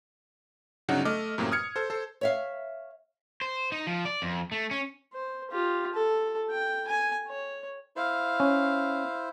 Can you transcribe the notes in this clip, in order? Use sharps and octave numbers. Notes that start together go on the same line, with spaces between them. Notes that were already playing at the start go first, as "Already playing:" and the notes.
G1 C#3 F#3 D4 D#4 F#5
A3 D#5 D6 F6
F#2 A2 C3 A#3
D#6 F6 G#6 C#7
A4 C5
A4 C5
C#5 E5 F5
C5
D#4
F3
D5
F2
A3
C#4
C5
F4 G4
A4
G5
G#5
C#5
E4 C5 F5
C#4